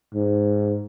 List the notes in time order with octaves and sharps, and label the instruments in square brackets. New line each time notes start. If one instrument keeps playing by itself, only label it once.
[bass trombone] G#2